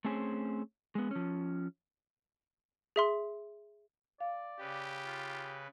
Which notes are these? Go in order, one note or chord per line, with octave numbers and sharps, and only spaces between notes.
A3 C4 C#4 G#4 C5
G#3 B3
F3 C#4
G#4 E5 C6
D5 F5
C#3 G4 B4
F4